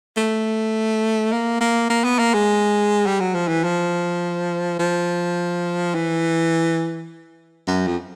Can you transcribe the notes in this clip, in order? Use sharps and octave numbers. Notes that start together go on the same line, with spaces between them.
A3
A#3
A#3
A#3
B3
A#3
G#3
G3
F#3
F3
E3
F3
F3
E3
F#2
F2